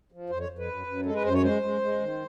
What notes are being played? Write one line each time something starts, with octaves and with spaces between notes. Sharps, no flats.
F3
F2 C5
C#5
F2
B4
F#2
F#2
G#3 A4
B4
F#2 C5
C#5
G#3 C5
G#3
G#3
D#3